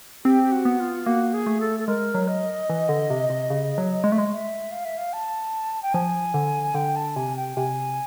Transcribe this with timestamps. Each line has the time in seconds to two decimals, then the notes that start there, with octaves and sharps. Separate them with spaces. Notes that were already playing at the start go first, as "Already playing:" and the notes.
0.25 C4 G4
0.43 G4
0.52 F#4
0.65 B3
0.80 F4
1.06 A#3 F#4
1.33 G#4
1.47 A3
1.60 A4
1.79 A4
1.87 G#3 A#4
2.14 F#3
2.28 D#5
2.70 E3
2.89 D3
3.10 C3
3.30 C3
3.50 C#3
3.78 F#3
4.04 G#3
4.12 A3
4.18 G#3
4.32 E5
4.71 F5
4.85 E5
4.98 F5
5.13 A5
5.83 G5
5.94 F3 G#5
6.34 D3
6.74 D3 G5
6.96 A5
7.16 C3 G#5
7.36 G5
7.57 C3 G#5